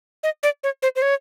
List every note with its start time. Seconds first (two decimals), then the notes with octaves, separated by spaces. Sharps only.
0.23 D#5
0.43 D5
0.63 C#5
0.83 C5
0.96 C5
1.02 C#5